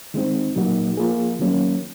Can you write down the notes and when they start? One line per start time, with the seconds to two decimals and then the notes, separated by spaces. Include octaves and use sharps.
0.14 D#3 G#3 C4 D#4
0.56 A#2 F#3 A#3 D#4 F#4
0.97 F3 A#3 F4 G#4
1.39 D#3 F#3 A#3 C#4